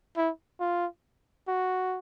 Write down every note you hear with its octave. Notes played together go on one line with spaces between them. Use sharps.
E4
F4
F#4